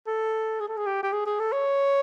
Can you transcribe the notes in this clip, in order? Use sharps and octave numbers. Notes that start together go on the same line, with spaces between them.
A4
G#4
A4
G#4
G4
G4
G#4
G#4
A4
C#5